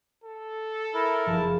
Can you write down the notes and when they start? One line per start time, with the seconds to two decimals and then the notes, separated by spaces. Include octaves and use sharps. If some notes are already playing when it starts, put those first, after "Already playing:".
0.24 A4
0.94 E4 A#4
1.26 F#1 F3 A5